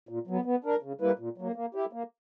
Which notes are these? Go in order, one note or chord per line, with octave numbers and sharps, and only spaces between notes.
A#2
F#3 B3
B3
D4 A#4
C#3
G3 A#3 E4 B4
A#2
F#3 A#3
A#3
E4 G4
A#3